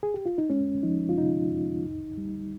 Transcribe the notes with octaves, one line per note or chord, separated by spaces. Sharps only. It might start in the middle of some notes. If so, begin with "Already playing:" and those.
G#4
G4
F4
D#4
G#3 C#4
F3 D#4
F4
C3 D#4
F2
C2
G3